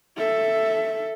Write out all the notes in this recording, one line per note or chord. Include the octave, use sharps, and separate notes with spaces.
A4 E5